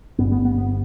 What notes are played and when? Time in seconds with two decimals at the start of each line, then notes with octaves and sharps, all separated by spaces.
0.19 G1 G2 B3
0.32 B3
0.45 B3
0.58 B3